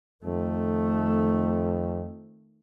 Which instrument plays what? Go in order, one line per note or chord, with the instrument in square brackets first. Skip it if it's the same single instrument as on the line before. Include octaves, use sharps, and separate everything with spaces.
[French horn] F2 [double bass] D#3 A3